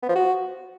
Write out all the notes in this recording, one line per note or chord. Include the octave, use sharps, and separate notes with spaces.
B3
F3
F#4